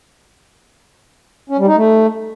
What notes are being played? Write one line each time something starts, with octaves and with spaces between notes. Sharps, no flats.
C#4
G3
D#4
A3